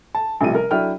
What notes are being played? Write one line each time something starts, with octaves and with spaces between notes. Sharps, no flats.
A5
A1 C3 F3 G3 D#7
A#4
F#3 D4 E4 A4 G5 F6